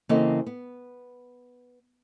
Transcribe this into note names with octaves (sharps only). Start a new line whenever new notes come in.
C#3 E3 A#3 C4 A4 D#5
B3